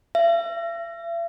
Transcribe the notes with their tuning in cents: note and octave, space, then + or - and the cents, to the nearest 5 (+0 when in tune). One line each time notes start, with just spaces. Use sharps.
E5 +45